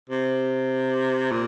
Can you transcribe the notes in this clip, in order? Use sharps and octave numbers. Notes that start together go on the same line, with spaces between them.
C3
A#2